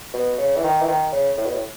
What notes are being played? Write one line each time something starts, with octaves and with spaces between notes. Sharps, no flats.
B2
C#3
E3
D#3
E3
D#3
C#3
A2
B2
A2